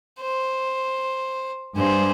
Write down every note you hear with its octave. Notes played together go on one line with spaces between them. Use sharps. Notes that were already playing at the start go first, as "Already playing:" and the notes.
C5
G2 G#4 C5